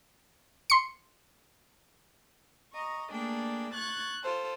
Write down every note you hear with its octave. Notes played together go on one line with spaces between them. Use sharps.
C6 C#7
D#5 A#5 C#6
A3 A#3 D4 G#4 G5
C#6 F#6 G#6 A6
F4 A4 C5